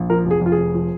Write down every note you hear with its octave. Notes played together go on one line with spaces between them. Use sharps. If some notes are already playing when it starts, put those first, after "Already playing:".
Already playing: A#1
F3 A#4
F1
G#4
F2 F4
G#4
F1
F3